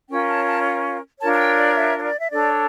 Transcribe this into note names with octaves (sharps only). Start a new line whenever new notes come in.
C#4 F4 A#4 C#5 G5
A5
A5
D4 F4 A#4 C#5 A5
A5
G5
D5
E5
C#5
D5
E5
D4 A4 C#5 D5